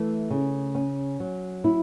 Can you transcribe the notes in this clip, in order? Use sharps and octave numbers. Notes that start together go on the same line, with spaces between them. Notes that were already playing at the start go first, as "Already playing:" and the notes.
Already playing: E3 A3
C#3
C#4
F#3
E4